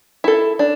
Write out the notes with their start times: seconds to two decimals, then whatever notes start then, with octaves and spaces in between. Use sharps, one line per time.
0.24 E4 A4
0.59 D4